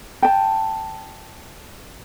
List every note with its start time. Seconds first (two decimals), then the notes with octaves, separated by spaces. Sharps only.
0.23 G5 A5